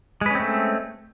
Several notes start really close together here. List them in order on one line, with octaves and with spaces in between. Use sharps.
G#3 B4 C#4 C4 A3